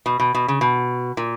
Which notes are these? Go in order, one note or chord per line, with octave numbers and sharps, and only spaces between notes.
B2
B2
B2
C#3
B2
A#2